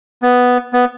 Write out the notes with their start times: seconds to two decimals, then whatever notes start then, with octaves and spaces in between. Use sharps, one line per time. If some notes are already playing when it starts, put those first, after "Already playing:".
0.22 B3
0.73 B3